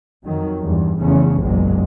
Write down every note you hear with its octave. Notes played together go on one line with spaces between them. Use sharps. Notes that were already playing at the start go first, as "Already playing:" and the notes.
F2 D#3 F#3
E2 G2
F1 E2 C#3 E3 A3 C#4
F#1 B1 E2 A#2 F#3 G#3